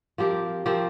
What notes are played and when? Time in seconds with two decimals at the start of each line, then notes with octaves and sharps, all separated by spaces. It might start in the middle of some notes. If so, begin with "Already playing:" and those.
0.18 F3 C4 G4 A#4
0.66 F3 C4 G4 A#4